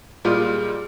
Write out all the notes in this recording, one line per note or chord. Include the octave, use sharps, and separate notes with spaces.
A#2 G3 G#3 F4